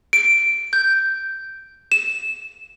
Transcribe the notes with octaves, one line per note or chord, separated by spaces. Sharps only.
D7
G6
E7